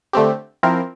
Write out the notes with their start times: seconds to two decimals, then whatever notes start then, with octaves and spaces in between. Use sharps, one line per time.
0.13 D3 A3 C4 G4
0.63 F3 C4 E4 A#4